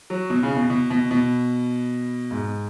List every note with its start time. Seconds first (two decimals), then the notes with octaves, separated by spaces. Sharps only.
0.10 F#3
0.30 B2
0.43 C#3
0.56 B2
0.70 B2
0.90 B2
1.11 B2
2.31 G#2